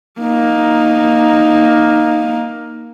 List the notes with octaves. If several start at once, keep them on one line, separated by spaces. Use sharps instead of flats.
A#3 D#4